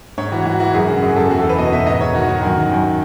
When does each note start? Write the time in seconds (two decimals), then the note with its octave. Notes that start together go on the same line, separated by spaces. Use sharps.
0.18 G#2 C#5
0.32 E3 F#4
0.46 G#2 F#4
0.60 E3 F#4
0.74 F#2 G#4
0.88 C#3 F#4
1.02 F#2 G#4
1.16 F#2 A4
1.30 E2 F#4
1.40 A4
1.44 E2
1.49 B4
1.58 B2 D#5
1.72 B2 E5
1.87 G#2 D#5
2.01 G#2 C#5
2.14 D#3 F#4
2.29 D#3
2.43 F#2 F#4
2.57 D#3
2.71 F#2